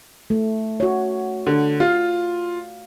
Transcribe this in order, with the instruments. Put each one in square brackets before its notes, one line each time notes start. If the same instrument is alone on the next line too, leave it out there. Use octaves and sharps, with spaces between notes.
[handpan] A3
F#4 C#5
[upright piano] D3
[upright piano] F4 [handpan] F5